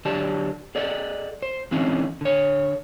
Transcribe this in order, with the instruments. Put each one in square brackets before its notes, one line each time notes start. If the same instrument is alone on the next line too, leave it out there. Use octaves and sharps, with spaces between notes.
[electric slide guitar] D3 F#3 G4 D5 A5
G#4 A4 D5 D#5 F#5
C5
D3 E3 C4 C#4 D#4
D3 C#5